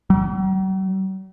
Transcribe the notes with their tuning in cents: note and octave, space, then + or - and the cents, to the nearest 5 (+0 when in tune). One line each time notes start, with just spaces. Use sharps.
F#3 +45